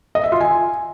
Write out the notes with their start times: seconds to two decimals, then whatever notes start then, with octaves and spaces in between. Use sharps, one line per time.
0.15 D#5
0.24 E5
0.32 F4
0.40 G#5